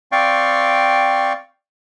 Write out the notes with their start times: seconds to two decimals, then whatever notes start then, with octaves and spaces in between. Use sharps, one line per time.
0.12 C4 D5 F5 G5 C#6